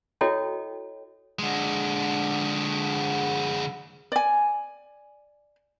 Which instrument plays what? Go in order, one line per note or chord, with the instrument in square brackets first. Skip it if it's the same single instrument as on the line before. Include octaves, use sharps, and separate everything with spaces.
[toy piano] E4 F#4 A4 C#5 D#5 G5
[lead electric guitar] D3 G#3
[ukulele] D5 G#5